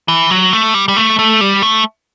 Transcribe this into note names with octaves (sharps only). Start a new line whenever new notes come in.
E3
F#3
A3
G3
G3
A3
A3
G3
A3